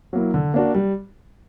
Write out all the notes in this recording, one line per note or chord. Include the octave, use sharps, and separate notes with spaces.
F#3 A#3 E4
D3
A#3 D4 F#4
G3